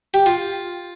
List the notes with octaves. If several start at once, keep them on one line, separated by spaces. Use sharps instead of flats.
G4
F4